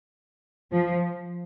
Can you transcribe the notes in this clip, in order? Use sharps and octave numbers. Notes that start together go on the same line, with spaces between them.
F3